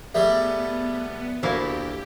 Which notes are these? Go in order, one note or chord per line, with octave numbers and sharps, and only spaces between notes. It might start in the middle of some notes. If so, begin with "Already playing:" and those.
G3 A3 B3 G#4 E5
D2 A#2 A#3 E4 G4